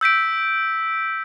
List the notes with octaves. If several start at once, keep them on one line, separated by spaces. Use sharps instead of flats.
E6 G6 B6 D7